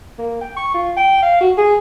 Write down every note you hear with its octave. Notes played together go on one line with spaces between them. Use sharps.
A#3
G5
C#6
F4
G5
F5
F#4
G#4